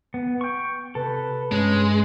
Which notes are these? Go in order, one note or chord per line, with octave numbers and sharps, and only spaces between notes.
B3
G5 C#6
C3 A4 B4
G2 G#3 C#4